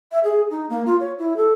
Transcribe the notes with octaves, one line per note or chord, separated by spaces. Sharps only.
E5
G#4
D#4
A#3
F4
C#5
E4
A4